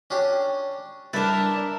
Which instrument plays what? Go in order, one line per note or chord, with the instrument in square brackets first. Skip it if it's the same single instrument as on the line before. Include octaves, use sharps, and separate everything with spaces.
[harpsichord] C#4 D4 G4
[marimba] G3 A6 [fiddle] D4 [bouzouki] E4 A#4 [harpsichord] B4